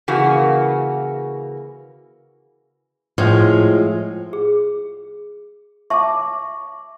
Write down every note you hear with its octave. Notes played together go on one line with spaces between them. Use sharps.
C#3 E3 A#3 F#4
A2 F3 G#3
G#4
C#5 E5 A5 C#6 D6